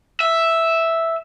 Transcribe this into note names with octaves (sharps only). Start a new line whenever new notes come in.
E5